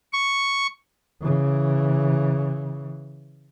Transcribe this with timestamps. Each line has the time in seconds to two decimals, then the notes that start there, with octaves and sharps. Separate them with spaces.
0.13 C#6
1.21 C#3 E3